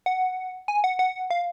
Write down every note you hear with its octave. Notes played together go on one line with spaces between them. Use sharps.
F#5
G#5
F#5
F#5
F5